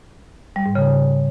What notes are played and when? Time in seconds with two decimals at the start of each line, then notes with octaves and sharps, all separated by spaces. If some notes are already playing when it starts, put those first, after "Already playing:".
0.56 G3
0.66 G#2
0.75 C#3